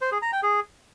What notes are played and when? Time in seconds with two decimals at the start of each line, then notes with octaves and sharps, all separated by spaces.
0.01 C5
0.12 G#4
0.22 A#5
0.32 G5
0.43 G#4